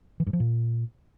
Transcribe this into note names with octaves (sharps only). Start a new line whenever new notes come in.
E3
G2
F3
A#2